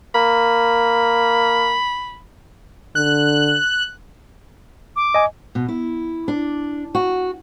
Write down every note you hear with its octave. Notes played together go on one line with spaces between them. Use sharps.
A#3 B5
D3 F#6
D6
D#5 G#5
B2
E4
D4
F#4